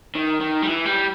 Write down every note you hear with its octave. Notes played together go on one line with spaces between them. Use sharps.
D#3
D#3
G3
E3
G3